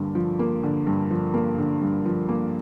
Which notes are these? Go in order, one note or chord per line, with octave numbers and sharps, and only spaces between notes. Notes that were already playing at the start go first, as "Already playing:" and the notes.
Already playing: G2 D3 A#3
F3
A#3
D3
G2
F3
A#3
D3
G2
F3
A#3